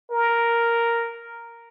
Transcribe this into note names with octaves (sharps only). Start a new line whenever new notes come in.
A#4